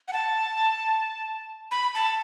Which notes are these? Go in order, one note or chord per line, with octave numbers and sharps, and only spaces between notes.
F#5
A5
B5
A5